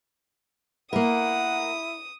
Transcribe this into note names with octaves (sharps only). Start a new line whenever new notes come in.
A#3 E4 A#4 F#5 D#6